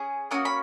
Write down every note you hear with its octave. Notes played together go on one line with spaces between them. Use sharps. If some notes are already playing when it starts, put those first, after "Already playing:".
Already playing: C#4 G#4
A#3 C#4 F#4 D#6
B5